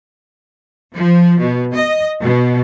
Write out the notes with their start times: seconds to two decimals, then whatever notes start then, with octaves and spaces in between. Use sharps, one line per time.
0.95 F3
1.40 B2
1.75 D#5
2.22 B2